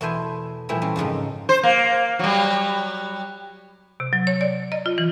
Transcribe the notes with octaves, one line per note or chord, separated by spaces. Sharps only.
E2 B2 A3 E4 C5 G#5
A#2 E3 F3 G3 A3 E4
E3 C4 C#4
F2 G#2 C#3 D#4
C5
A#3
F#3 G3
C3
F#3
C#5
D5
D#5
F4
E3